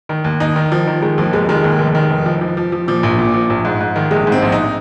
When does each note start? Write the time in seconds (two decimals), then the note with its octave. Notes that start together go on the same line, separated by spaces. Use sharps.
0.09 D#3
0.24 D#2
0.40 D#2 D#4
0.56 D#3
0.72 D#3 F3
0.87 D#3
1.02 D#3 G#3
1.18 D#2 F3
1.33 F1 G#3
1.49 D#3 G#3
1.64 D#2
1.79 F1
1.95 D#3
2.10 F1
2.26 F3
2.41 F3
2.57 F3
2.72 F3
2.88 A#2 F3
3.03 A#1
3.18 A#2
3.34 F3
3.50 A#1
3.65 G#2
3.81 G#2
3.96 D#3
4.11 A#1 G#3
4.27 G#2
4.32 C4
4.42 A#1
4.52 D#4